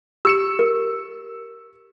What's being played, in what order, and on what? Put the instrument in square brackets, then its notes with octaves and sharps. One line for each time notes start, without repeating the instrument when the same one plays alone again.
[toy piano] G4 [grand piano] E6 C#7 E7
[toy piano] A#4